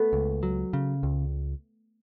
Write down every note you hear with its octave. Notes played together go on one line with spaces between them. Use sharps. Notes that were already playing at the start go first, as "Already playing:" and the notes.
Already playing: A3 B3
C#2
F#3
C#3
C#2